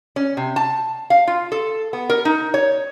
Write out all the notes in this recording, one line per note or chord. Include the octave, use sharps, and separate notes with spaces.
C#4
C3
A5
F5
F4
A4
B3
A#4
D#4
C#5